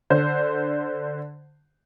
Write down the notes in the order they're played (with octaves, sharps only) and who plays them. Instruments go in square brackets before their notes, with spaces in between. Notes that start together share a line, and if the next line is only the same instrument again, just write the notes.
[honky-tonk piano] D3 C5